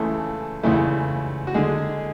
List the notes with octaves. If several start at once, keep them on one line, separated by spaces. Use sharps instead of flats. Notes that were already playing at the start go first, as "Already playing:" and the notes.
Already playing: C#2 C#3 E3 A3 A4
C#2 C#3 E3 A3
F#4
D3 G#3 G#4